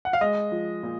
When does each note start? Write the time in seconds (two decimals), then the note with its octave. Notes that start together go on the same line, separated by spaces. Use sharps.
0.05 F#5
0.13 F5
0.21 G#3 D#5
0.52 F3
0.83 A#2